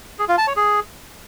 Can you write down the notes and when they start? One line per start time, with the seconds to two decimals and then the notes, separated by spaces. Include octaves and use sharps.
0.19 G#4
0.28 F4
0.38 A5
0.47 C#5
0.57 G#4